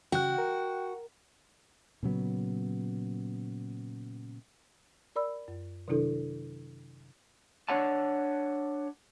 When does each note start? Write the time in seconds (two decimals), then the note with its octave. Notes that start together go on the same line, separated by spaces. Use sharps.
0.12 C#3 F#4 G5 F#6
0.38 A#4
2.03 A#2 C#3 F#3 B3
5.16 A#4 D5 B5 E6
5.48 F#2
5.88 C3 D#3 F#3 D4 E4 A4
7.69 D4 C#5 F#5 A5